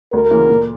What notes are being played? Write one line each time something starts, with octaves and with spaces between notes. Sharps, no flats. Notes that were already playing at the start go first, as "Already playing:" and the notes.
D2 A#4
C#3 E3 A#3
A#2